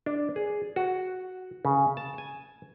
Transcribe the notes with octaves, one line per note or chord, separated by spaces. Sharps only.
D4
G#4
F#4
C#3
A5
G#5